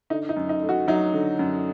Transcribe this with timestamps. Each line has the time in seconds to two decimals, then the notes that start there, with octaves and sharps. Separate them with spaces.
0.10 D3 D#4
0.29 D#4
0.36 F#2
0.49 D#4
0.62 A3
0.69 F#4
0.88 F#3 D#4
1.14 D3
1.39 F#2